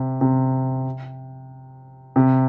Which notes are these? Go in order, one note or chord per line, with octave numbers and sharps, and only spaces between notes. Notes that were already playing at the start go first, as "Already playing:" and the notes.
Already playing: C3
C3
C3